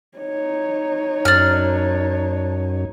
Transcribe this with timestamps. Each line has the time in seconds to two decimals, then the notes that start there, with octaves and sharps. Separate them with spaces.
0.18 D#4 C#5
1.25 F#2 D4 F6